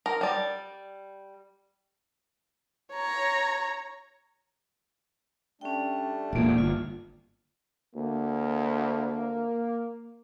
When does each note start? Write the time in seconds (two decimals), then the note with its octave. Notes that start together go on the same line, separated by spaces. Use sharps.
0.06 A#4
0.21 G3 D5
2.92 C#5 A#5
5.61 G3 A3 C#4 D4 G5
6.33 E1 A#2 A#3 D5
6.58 G1 F4
7.96 D2 A#3